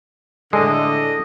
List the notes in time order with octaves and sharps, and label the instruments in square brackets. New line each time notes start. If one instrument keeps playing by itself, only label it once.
[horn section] A2 D3 [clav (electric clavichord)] G#3 [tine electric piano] A4 [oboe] D#5